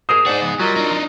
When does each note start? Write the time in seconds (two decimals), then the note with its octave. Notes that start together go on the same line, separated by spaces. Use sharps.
0.09 G#4 A#4 C5 D#6
0.26 D#4 G#4 C5 D5 F#5 A5
0.41 C#3 F3 B3
0.59 F#3 G3 F4 A#4 D#5
0.76 D4 D#4